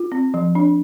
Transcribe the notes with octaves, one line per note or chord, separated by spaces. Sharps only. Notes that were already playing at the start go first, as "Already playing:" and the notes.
Already playing: F4
C4
F3
D4